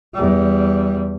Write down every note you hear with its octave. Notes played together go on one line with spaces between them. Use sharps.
E2 G3